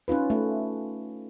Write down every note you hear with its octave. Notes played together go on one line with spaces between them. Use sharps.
C#4 D#4 F4 B4
A3